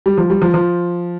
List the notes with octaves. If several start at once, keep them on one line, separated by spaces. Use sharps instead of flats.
G3
F3
G3
F3
F3